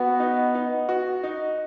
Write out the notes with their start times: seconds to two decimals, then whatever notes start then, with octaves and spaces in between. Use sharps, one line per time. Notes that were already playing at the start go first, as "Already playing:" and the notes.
Already playing: B3 F#4
0.20 D#4
0.55 D#4
0.89 F#4
1.23 D#4